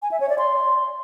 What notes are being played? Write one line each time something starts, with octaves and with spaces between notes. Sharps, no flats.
G#5
E5
C#5
D5
C6